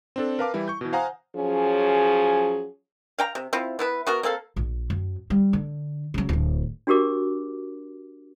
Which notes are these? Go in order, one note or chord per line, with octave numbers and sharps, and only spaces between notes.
C4 D4 A4
A#4 B4 F5 A5 D6
E3 G3 E4
C#6 G6
B2 E3
C5 F5 F#5 G#5 A#5 D#6
F3 F#3 C#4 G#4
F5 G5 A#5
C3
C4 E4 F4
B3 E4 B4
B3 F#4 A#4
A#3 C4 A4 F5
A#1
F#2
G3
D3
C#3 F#3
D1 F#3
D4 F#4 G4 A#4 D6